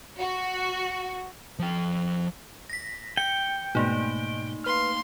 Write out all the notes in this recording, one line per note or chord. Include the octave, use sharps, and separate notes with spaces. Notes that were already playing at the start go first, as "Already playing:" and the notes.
F#4
F3 G5
A#6 B6
G5 C#7
G#2 B2 A3 A#3 D#4
B4 F5 C6 F6